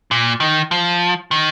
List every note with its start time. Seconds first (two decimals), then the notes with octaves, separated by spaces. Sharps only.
0.11 A#2
0.40 D#3
0.71 F3
1.31 D#3